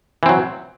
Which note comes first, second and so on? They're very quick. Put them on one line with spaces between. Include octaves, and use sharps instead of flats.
E3 C4 F#3